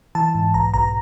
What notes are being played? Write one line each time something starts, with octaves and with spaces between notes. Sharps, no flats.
E3 A5
G#2
B1 A#5
B1 A#5